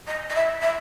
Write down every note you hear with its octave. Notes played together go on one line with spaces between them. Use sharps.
D#5
D#5
E5
E5